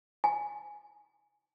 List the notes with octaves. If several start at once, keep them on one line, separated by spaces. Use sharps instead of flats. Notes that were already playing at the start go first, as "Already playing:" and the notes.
G#5